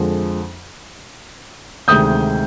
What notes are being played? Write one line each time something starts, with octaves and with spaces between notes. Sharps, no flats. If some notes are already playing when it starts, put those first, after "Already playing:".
Already playing: F2 D3 F3 G#3
D2 C3 D#3 G#3 D#6 G6